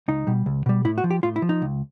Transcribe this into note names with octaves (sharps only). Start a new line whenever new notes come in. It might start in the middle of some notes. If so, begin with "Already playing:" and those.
C#2 D#4
B2 G3
C#2
B2 G3
A2 E4
F#4
F3
G4
A2 F4
E4
F3
D#4
C#2